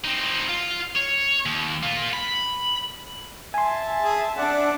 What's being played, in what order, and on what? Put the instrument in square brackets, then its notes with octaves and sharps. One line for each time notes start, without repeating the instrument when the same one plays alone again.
[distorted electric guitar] C4 D#4
F4
C#5
D#2
A#3 F4
B5
[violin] E5 A5 [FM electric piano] G#5 C6
[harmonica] G#4
[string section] D4 [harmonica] D5 F#5